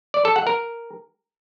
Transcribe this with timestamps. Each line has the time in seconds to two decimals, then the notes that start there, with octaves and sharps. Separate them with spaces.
0.14 D5
0.25 A4
0.36 F#5
0.47 A#4